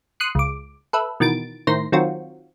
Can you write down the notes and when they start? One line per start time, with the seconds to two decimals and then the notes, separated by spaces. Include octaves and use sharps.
0.20 C6 D#6 F#6 C7 C#7
0.35 C#2 D6
0.93 A4 B4 E5
1.20 B2 D#3 E3 A6 D7
1.67 A2 D#3 C5 A#6 C7
1.92 D#3 F#3 C4 F4 F#4